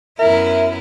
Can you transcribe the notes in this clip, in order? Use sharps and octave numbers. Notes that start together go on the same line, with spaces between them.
F#2 B3 E4 A#4 E5